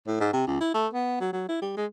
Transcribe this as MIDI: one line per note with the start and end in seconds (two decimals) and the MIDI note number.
0.07 0.17 45
0.20 0.29 44
0.33 0.43 48
0.47 0.60 37
0.61 0.70 64
0.74 0.87 57
0.93 1.16 59
1.21 1.32 54
1.32 1.44 54
1.48 1.59 64
1.61 1.73 55
1.77 1.85 56